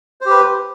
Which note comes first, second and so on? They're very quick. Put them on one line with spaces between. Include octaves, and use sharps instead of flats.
C5 G4 B4